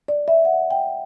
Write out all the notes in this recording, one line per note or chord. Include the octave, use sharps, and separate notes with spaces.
D5
E5
F#5
G5